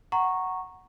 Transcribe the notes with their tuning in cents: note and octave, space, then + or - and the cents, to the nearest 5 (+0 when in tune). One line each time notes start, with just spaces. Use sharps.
F#5 +10 A#5 +0 C#6 -10